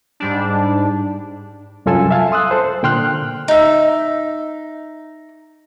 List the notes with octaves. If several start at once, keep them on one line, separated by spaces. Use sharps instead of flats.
G#2 G3 D4
C2 F#2 F4 A4 G#5 E6
E5 F5 G#5 A5
C6 D#6 E6 F#6
A4 C5
A#2 D3 G5 C6 F6 F#6
D#4 E5